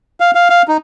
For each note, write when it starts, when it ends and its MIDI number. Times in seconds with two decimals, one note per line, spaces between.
0.20 0.31 77
0.35 0.49 77
0.50 0.62 77
0.68 0.77 63